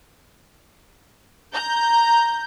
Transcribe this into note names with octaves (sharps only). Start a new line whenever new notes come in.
A#5 G6